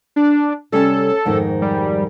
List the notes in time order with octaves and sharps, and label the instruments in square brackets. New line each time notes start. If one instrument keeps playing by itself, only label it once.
[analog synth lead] D4
[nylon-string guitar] C3 G3 C#4 [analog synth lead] A4
[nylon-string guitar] F2 G#2 D#3
[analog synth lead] G3